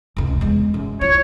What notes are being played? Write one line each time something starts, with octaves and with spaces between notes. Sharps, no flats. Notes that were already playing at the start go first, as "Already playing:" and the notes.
F1 C#2
E2 G#3
F#2
E4 F4 C#5